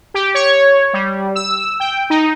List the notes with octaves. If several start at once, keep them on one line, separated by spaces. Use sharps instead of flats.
G4
C#5
G3
E6
G5
D#4